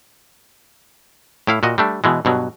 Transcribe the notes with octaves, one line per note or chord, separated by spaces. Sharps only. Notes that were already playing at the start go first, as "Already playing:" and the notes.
A2 E4 F5
A#2 F#4 D#5
G3 A3 D4
B2 E3 G#3
G2 B2 F#3